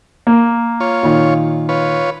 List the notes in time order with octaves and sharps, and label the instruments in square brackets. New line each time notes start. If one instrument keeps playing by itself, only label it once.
[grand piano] A#3
[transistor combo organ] F4 C#5
[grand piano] A#2 D#3 F5
[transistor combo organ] F4 B4 C#5